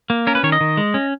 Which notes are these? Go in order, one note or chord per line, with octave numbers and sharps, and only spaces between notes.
A#3
C#4 A#4
B4
D#3 C#5
D#5
D#3
G#3
C#4